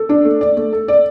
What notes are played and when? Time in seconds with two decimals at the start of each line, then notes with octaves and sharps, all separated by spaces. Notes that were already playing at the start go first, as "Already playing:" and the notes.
Already playing: A4
0.09 D4
0.25 A3
0.41 D5
0.57 A3
0.73 A4
0.88 D5